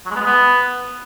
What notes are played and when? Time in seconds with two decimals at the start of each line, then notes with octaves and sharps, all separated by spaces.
0.06 F#3
0.11 G#3
0.16 B3
0.21 G#3
0.26 B3